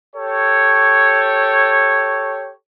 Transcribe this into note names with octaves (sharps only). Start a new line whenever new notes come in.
G4 A4 C#5